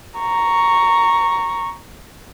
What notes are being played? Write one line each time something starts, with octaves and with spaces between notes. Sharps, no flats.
A#5 C#6